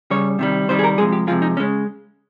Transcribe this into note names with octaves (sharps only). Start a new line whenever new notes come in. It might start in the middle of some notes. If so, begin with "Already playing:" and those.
C#3 G3 C#5
C3 D#3 G3
C3 D#3 G3 C5
G#4
A#4
C3 F3 G#3 G#4
G4
C3 F3 G#3 F4
D#4
C#3 G#3 C#4